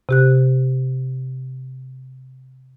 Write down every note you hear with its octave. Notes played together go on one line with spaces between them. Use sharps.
C3 G4 F#6